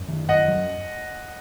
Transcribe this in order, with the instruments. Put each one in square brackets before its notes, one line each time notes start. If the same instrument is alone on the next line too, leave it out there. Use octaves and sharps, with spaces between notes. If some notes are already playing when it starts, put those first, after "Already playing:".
Already playing: [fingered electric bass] F#2
D#3
[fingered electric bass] F#2 [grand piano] D#5 F#5
[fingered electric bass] F#3